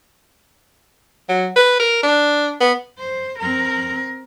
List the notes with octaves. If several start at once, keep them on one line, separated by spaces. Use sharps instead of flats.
F#3
B4
A#4
D4
B3
C5
C4 A#4